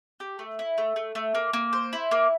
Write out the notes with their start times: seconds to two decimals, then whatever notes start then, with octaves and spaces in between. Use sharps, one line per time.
0.20 G4
0.39 A3
0.59 E4
0.78 A3
0.96 A3
1.15 A3
1.35 A#3
1.53 A#3
1.73 C5
1.93 E4
2.11 A#3